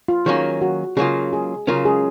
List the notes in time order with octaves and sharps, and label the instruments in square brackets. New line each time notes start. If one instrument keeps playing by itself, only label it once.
[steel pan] F4
[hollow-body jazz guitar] D#3 F#3 A#3 C#4 [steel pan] G#4
[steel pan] F#4
[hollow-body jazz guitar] C#3 F#3 A#3 F4 [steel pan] G#4
[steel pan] G#4
[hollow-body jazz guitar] C#3 F#3 C#4 F4 [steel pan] A#4
[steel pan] G#4